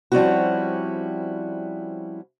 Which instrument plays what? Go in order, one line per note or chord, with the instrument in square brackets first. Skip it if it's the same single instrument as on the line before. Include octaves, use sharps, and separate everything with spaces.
[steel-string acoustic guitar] F3 G3 C4 C#4 E4 F#4